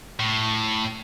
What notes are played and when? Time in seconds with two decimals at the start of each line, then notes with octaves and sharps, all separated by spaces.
0.20 A2